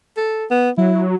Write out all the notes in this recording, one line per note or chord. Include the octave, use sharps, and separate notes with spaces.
A4
B3
F#3 E4